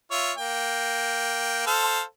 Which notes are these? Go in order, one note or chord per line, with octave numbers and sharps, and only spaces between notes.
F4 C#5 E5
A#3 G5
A4 C5 F5